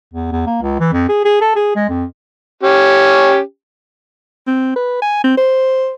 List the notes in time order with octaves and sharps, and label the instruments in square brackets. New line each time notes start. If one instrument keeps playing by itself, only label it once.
[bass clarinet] E2
E2
A#3
C#2
E3
F2
G#4
G#4
A4
G#4
G#3
F2
[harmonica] C#4 G4
[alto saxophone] C4
B4
G#5
C4
C5